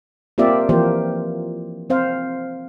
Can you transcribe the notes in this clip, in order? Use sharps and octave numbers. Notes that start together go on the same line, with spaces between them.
A#3 C4 F4 G4 D5 E5
E3 F3 A#3 G4 C5
C4 C5 F5